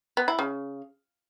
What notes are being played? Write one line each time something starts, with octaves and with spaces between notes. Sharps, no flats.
B3
E4
C#3